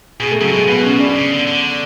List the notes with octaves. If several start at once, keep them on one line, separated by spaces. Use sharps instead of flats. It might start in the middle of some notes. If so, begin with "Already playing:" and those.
B2 G#4
A3
C#3 F#3
B2 G#3
B2 B3
C#4
D4
C#3
D3
D3